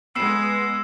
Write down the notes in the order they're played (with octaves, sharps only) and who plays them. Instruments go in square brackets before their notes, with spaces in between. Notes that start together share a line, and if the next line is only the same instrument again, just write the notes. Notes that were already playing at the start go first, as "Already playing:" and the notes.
[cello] G#3 [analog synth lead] B3 [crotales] E6 C7 E7